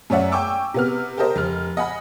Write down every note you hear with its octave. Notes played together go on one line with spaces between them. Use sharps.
F#2 A3 C#5 D5 E5 F#5
G5 G#5 C#6 D6 E6
C3 B3 F6
G4 A4 A#4 C5 D#5
F1 F6
D#5 F#5 G#5 B5